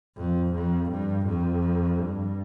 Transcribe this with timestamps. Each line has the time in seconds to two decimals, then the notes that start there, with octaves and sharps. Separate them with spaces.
0.17 F2
0.54 F2
0.90 G2
1.26 F2
1.98 G2